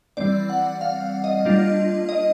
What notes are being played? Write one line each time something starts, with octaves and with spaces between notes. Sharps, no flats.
E3 G3 C4 D5
F#5
F5
D#5
G3 A#3 D4 F4
D#5